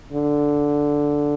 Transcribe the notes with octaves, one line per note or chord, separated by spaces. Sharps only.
D3